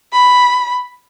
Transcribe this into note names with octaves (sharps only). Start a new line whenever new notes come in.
B5